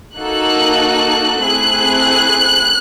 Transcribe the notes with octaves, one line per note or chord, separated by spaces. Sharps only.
A#3 D#4 F#4 A4 F#6
A3 C4 E4 G#4 F#6